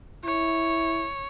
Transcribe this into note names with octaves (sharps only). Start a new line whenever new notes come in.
E4 C#5